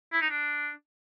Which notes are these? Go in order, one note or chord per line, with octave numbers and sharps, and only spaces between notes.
E4
D#4
D4